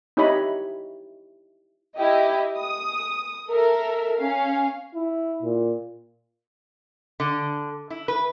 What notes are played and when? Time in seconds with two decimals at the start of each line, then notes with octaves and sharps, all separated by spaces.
0.17 D#4 E4 G4 C#5 D#5 B5
1.97 E4 G4 D#5
2.57 D#6
3.50 A4 A#4 E5
4.17 C#4 F5
4.95 E4
5.43 A#2
7.20 D3
7.90 E4
8.08 B4